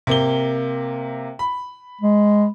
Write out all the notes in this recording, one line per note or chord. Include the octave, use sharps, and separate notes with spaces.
C3 A#3 G7
B5
G#3